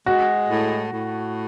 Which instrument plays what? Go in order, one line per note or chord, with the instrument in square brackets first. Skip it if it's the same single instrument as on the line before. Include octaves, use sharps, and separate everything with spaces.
[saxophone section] G#3 [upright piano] F#4
[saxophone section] A2
A2